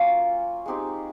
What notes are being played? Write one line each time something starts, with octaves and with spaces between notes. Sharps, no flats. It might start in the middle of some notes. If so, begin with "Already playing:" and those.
Already playing: F#3 A#3 C#4 F4
G#3 C4 D#4 G4